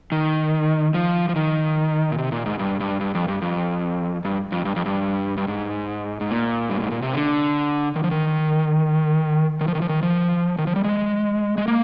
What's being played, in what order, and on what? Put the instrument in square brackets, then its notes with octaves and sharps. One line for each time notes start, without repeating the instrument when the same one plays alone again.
[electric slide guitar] D#3
F3
F3
D#3
A#2
C3
A#2
G#2
G2
G2
G2
F2
G2
F2
G2
F2
G2
F2
G2
G2
G#2
G#2
A#2
G2
G#2
A#2
C3
D3
D#3
F3
D#3
D#3
F3
D#3
F3
D#3
F3
D#3
F3
G3
G#3
G#3
A#3